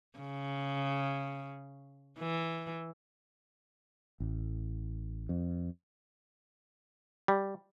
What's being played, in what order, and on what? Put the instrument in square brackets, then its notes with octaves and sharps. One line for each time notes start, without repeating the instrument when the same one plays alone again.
[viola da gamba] C#3
E3
[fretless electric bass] A1
F2
[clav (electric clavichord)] G3